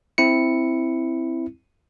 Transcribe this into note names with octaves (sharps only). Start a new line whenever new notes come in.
C4 E4 C#7